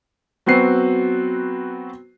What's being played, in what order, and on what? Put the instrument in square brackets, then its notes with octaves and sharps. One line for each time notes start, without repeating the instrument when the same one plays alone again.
[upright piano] F#3 B3 C4 F#4 C7